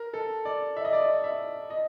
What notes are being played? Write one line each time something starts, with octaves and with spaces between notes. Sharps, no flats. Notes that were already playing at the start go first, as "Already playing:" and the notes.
Already playing: A#4
A4
D5
E5
D#5
D5
D#5
E5
D#5